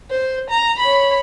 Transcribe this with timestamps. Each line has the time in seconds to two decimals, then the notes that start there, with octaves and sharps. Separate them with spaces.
0.10 C5
0.50 A#5
0.79 C#5 B5